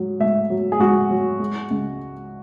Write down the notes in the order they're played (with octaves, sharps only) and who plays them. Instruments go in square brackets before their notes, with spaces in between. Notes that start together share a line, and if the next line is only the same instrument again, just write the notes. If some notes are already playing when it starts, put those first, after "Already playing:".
Already playing: [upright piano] G#2 F#3
G#2 E5
F#3
G#4
G#2 F#4
F#3
G#3
C#2